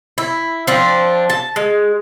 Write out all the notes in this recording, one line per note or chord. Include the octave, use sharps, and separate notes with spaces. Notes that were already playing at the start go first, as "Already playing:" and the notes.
E4
F3 C4 D4
A5
G#3